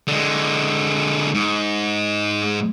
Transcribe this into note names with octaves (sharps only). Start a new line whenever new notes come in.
D3 G#3
G#2